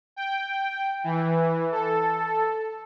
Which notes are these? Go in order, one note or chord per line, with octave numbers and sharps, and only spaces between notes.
G5
E3
A4